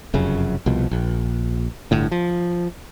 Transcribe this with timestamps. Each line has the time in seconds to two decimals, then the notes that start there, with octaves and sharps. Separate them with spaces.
0.14 F1 F#2 C#3
0.66 C2 B2 F3
0.91 A#1
1.91 G1 A2 D3
2.11 F3